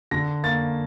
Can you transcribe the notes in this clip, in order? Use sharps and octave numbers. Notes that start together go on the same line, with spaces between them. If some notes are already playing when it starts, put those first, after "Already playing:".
D3 A#6
A#3 A6